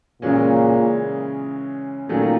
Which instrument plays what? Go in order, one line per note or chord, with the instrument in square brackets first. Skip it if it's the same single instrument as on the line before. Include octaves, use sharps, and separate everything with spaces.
[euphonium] A#2 [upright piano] C#3 E3 G#3 C#4
[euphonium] A#2 [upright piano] D#3 F#3 A3 C#4